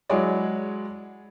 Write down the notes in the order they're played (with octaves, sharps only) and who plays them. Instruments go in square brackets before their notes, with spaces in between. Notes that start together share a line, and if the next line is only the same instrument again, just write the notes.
[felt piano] F#3 G#3 E4 G#4 C#5 D5